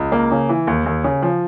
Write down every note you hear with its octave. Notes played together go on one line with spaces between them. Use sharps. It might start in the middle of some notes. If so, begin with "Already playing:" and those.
Already playing: C#2
A#3
C#3
E3
D#2
D#2
C#3
F3